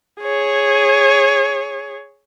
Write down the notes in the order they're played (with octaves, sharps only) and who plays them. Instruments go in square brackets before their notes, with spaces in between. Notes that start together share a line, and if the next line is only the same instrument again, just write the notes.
[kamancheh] G#4 C#5